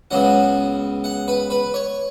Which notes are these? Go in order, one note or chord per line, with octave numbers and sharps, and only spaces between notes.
C#2 C#3 F#3 B3 F#5
F#5
B4
B4
C#5